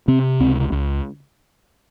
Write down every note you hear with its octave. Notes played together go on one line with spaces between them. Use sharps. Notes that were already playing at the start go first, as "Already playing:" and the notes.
C3 C4
C#2 C4
C#2